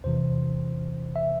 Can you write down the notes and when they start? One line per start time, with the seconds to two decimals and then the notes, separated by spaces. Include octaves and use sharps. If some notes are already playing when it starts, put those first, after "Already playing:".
0.04 E2 C3 E3 C5
1.16 E5